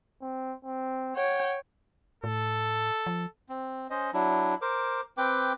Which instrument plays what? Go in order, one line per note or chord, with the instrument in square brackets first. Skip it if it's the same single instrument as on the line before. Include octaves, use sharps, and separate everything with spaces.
[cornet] C4
C4
[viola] C#5 G5 [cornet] F#5
[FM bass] A2 [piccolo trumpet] A4
[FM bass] F3
[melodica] C4
C#4 C5 D#5
F#3 D4 E4
A#4 C5 D6
C4 B4 G5 D6